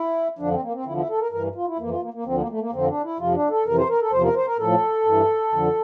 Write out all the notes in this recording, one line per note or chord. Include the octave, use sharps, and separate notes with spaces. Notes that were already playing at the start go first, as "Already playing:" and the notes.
Already playing: E4
F2 D3 F3 D4
C4
A#3
C4
E2 D3 F3 E4
E4
A4
A#4
G2 E3 A#4
F4
E4
F2 E3 A#3
F4
A#3
A#3
D2 D3 F3 C4
A#3
A3
A#3
F2 D3 F3 C4
D4
E4
F2 C3 F3 F4
D4
A4
F2 C3 E3 A#4
C5
A#4
A4
E2 C3 F3 C5
A#4
C5
A#4
A2 F3 A4
G2 E3
F2 D3 F3